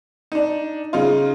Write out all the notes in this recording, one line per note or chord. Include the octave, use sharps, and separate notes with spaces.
D4 D#4
C#3 D#4 F4